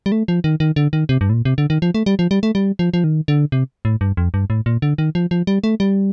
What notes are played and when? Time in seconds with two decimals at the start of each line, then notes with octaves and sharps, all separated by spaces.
0.06 G3
0.12 A3
0.28 F3
0.44 D#3
0.60 D#3
0.76 D3
0.93 D#3
1.09 C3
1.21 G2
1.29 A2
1.33 A#2
1.45 C3
1.58 D3
1.70 D#3
1.82 F3
1.94 A3
2.06 G3
2.19 F3
2.31 G3
2.43 A3
2.55 G3
2.79 F3
2.94 F3
3.04 D#3
3.28 D3
3.52 C3
3.85 A2
4.01 G2
4.17 F2
4.34 G2
4.50 A2
4.66 A#2
4.82 D3
4.98 D#3
5.15 F3
5.31 F3
5.47 G3
5.64 A3
5.80 G3